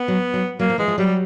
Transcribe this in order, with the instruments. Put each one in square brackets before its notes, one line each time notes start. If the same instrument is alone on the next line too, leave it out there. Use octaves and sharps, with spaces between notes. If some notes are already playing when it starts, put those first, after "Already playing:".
Already playing: [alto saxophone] B3
[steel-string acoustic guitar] F#3
F#3
[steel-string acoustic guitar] F#3 [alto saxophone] A#3
[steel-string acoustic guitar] F3
[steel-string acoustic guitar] E3 [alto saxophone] G#3
[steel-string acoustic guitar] F3
[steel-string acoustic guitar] F#3 [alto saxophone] G3